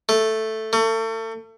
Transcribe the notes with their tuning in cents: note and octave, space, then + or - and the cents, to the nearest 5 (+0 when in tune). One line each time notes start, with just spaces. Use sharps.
A3 +0
A3 +35